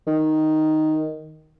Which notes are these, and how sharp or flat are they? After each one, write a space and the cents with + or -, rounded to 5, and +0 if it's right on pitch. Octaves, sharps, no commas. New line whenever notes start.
D#3 +0